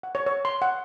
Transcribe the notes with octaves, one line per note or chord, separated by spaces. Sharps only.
F#5
C#5
C#5
C6
F#5